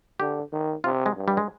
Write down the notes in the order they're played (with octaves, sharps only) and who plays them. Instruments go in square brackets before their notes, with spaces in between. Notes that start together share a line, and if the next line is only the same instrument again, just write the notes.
[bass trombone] D3 [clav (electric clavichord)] G4
[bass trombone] D#3
[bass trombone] C3 [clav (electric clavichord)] F4
[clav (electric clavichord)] G#3
[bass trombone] G2
[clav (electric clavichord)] G3
G#3